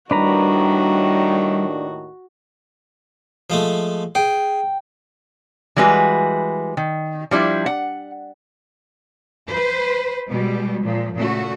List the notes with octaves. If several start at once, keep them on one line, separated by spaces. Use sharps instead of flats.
D#2 A2 D#3 G3 D4 F#4 B4 A#5
F3 G#3 A3
G#4 G5
E3 G3 G#3 F#4 B4
D#3
F3 G3 D4 E4
F#5
B4 C5
B2 G3 G#3
A#2 F3
A#2 C#3 A3 F#4